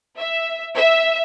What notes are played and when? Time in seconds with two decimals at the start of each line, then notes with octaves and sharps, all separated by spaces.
0.17 E5
0.76 E5